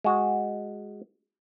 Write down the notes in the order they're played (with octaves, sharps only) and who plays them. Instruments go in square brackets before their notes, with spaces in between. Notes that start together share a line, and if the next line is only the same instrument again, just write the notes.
[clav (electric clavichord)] G#3 F#4